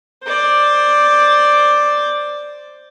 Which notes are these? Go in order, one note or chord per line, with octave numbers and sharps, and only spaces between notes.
C5 D5